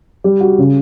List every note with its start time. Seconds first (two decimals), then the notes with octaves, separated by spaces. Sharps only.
0.24 G3
0.41 F#4
0.58 C#3